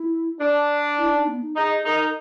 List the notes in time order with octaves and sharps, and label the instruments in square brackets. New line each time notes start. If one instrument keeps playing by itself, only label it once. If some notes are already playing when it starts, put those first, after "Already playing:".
Already playing: [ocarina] E4
[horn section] D4
[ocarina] E4
D#4
B3
D#4
[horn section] D#4 [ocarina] G#4
[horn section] D#4 [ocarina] A#4